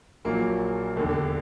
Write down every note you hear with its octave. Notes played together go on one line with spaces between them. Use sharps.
A#1 A#2 F#3 A#3
E1 D#2 D3